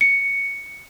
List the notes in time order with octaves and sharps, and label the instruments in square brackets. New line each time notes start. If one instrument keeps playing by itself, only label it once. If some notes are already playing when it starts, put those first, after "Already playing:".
[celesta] C#7